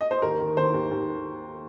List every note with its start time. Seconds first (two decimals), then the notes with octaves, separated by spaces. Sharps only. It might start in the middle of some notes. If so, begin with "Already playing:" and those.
0.01 D#5
0.11 C5
0.22 D#2 A#4
0.40 D#3
0.57 D#3 C5
0.74 D#2
0.91 D#2